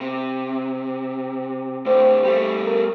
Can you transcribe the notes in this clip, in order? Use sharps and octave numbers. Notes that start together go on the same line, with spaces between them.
C3
A2 D3 C5
G3 A3
A#4